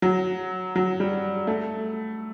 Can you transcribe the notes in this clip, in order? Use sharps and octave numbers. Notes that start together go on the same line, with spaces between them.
F#3
F#3
G3
A3